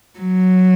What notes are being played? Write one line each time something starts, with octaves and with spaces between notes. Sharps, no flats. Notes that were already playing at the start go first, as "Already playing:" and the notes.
F#3